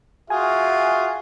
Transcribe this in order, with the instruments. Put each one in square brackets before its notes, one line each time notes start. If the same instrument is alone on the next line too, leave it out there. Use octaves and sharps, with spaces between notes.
[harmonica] F4 G#4 [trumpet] F#4 [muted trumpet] E5 [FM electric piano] G#5